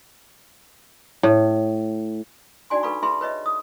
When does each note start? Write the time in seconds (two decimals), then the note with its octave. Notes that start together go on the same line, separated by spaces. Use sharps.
1.23 A2
2.70 D4 D#4 F#4 D5 G#5 C6
2.83 D#4 A4 B4 F5 B5 C#6
3.03 G#4 B4 E5 A5 B5 C6
3.21 B4 C#5 D#5 E5
3.46 D#6